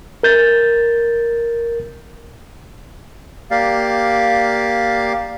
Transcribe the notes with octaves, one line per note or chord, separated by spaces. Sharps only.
A#4 G6 A6
A#3 G4 D5 F5